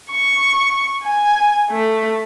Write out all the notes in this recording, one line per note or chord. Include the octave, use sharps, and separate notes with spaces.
C#6
G#5
A3